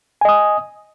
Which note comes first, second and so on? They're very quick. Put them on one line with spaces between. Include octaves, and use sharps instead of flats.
G#5 D#5 D#6